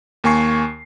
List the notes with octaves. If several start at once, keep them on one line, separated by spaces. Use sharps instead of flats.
D#2 A#3 G#5 C#6 C7